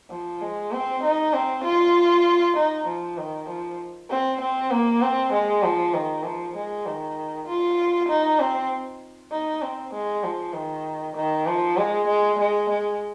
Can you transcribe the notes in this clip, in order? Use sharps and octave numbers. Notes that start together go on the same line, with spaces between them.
F3
G#3
C4
D#4
C4
F4
D#4
F3
D#3
F3
C4
C4
A#3
C4
G#3
F3
D#3
F3
G#3
D#3
F4
D#4
C4
D#4
C4
G#3
F3
D#3
D#3
F3
G#3
G#3
G#3
G#3